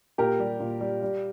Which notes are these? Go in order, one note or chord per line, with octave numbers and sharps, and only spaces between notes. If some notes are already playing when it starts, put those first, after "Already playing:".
A#2 G4 A#4
G3
A#2
G3
G3